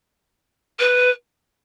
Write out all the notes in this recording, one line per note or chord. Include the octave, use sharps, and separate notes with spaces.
B4